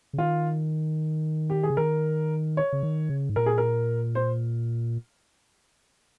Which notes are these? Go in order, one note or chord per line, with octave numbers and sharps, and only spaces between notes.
C#3
D#3 F4
G4
G#4
C#3
D#3 A#4
C#5
C#3
D#3
C#3
G#2
A#2 A#4
G#4
A#4
C5